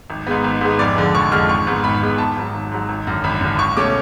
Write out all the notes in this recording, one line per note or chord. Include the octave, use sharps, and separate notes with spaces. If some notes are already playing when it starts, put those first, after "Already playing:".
G#1
G#2 G#3 B3
G#1
G#2 G#3 B3
F1 D5
F2 D3 G#3
F1 C#6
F2 D3 G#3 F6
G#1 C#6
G#2 G#3 B3
G#1 B5
G#2 G#3 B3
G#1 A5
G#2 F#3
G#1
G#2 F#3
G#1
F#2 D3
G#1 B5
F#2 D3
C#2 C#6
B2 A3 C#4 D6